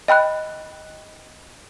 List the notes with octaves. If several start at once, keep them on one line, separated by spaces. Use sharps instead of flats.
D#5 G5 B5 F#6